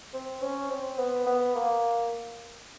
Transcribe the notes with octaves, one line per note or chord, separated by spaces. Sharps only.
C4
C#4
C4
B3
B3
A#3